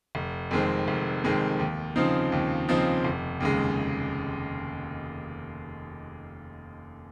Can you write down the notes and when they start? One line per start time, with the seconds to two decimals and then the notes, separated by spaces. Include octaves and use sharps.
0.15 F1
0.51 F2 D#3 G#3 C4
0.88 F1
1.24 F2 D#3 G#3 C4
1.59 D#2
1.96 C#3 F3 C4 D#4
2.32 D#2
2.68 C#3 F3 C4 D#4
3.05 F1
3.40 D#2 C#3 G#3